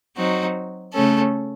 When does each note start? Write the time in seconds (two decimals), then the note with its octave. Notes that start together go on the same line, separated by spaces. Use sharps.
0.17 F#3 C4 D#4 F#4
0.93 C#3 A3 C#4 A4